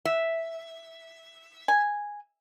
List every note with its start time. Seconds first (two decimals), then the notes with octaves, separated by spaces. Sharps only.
0.05 E5
1.68 G#5